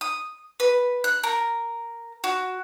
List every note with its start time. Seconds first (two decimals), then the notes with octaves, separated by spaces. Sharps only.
0.01 D#6
0.60 B4
1.04 F#6
1.23 A#4
2.24 F#4